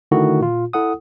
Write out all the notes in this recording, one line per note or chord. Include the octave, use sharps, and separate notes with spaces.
D3 D#3 A3 E4 F#4
A#2 F4
E4 A4 F#5 D#6